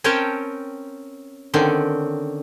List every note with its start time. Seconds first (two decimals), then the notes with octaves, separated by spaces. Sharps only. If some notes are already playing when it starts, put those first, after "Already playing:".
0.04 C4 C#4 A#4 C#5 G5 A5
1.54 D3 D#3 C4 C#4